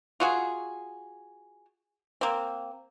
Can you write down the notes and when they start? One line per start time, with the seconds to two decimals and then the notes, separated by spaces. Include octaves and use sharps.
0.20 F4 F#4 G#4
2.21 A#3 C4